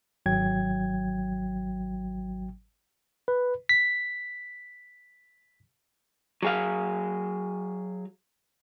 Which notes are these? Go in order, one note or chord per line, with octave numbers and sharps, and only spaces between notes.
G#1 F#3 G5 G#6
B4
B6
F#3 G#4 F5